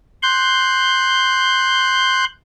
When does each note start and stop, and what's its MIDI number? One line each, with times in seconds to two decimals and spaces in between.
0.23 2.25 84
0.23 2.25 90
0.23 2.25 91